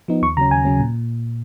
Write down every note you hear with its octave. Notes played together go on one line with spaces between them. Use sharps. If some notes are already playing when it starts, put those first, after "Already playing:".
F3 B3 D#4
D#2 C#6
C#3 F#3 C#4 A#5
D#2 G#5
C#3 F#3 C#4
A#2